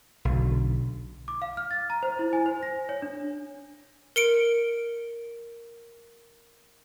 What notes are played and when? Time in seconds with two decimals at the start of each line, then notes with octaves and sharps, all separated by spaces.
0.25 B1 D3
1.28 D6
1.42 F5
1.57 F6
1.71 A6
1.90 A#5
2.03 C5
2.19 E4
2.33 G#5
2.46 C5
2.63 A#6
2.89 C#5
3.02 D4
4.16 A#4 C#7 D7